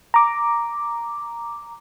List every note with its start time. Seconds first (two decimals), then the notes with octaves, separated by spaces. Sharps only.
0.14 A#5 D6